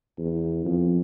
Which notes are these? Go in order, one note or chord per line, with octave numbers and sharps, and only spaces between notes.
E2
F2